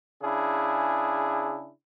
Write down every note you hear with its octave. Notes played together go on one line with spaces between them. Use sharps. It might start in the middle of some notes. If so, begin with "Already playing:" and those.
C#3 D4 E4 G#4